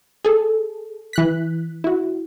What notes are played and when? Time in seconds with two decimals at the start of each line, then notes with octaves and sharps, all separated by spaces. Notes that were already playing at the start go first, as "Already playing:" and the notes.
0.25 G#4 A4
1.13 E3 F#6 B6
1.84 E4 F#4